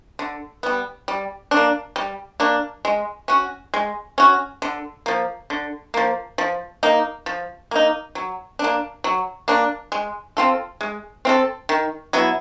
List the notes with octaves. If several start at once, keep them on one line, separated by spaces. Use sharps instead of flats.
D3
G3 B3
G3
D4
A#3
G3
A#3 D4
G#3
C#4 F#4
G#3
C#4 F#4
D3
F3 A#3
D3
F3 A#3
F3
A#3 D#4
F3
A#3 D#4
F#3
A#3 D4
F#3
A#3 D4
G#3
C4 F4 A4
G#3
C4 F4 A4
D#3
F#3 B3 E4